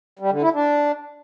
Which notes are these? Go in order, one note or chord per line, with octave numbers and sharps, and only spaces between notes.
G3
D3
E4
D4